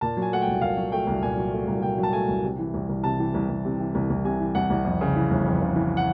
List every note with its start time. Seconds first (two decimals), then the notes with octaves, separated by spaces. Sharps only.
0.01 A#2 A5
0.17 F#3
0.22 G#5
0.32 A3 F#5
0.42 G5
0.47 C2
0.62 A#2 F5
0.77 F#3
0.92 A3 G5
1.07 C2
1.22 A#2 G#5
1.38 F#3
1.53 A3
1.68 C2
1.82 A#2 G5
1.98 F#3
2.03 A5
2.13 A3 G#5
2.29 C2
2.43 C3
2.59 E3
2.74 C2
2.89 C2
3.04 C3 A5
3.19 E3
3.34 C2
3.49 C2
3.65 C3
3.80 E3
3.95 C2
4.10 C2
4.24 C3 G#5
4.40 E3
4.55 C2 F#5
4.70 C2
4.85 F2
5.01 C#3
5.16 E3
5.31 G1
5.46 F2
5.61 C#3
5.76 E3
5.97 F#5